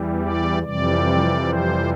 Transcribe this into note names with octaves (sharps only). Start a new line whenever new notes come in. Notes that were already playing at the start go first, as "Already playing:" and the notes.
Already playing: E2 E3 G3
D5
F2 C3 E3 G3 D5
C5